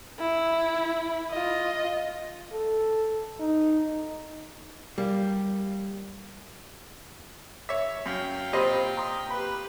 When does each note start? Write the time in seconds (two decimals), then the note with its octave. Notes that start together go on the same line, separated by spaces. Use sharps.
0.19 E4
1.30 F4 D#5
2.53 A4
3.40 D#4
4.98 G3 A#3
7.69 C#5 E5
8.06 F#2 F5 G5
8.53 A#2 C4 G4 C5 D#5 B5
8.97 A#5 C6 D#6
9.31 G4 B4 B5